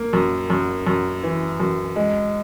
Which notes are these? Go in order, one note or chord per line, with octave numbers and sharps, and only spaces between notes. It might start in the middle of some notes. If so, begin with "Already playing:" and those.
Already playing: A#3
F#2
F#2
F#2
E3
F#2
G#3